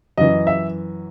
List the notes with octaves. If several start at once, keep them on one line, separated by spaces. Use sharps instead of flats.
F#2 E3 D#5
E5